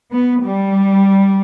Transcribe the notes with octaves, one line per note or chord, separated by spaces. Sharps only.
B3
G3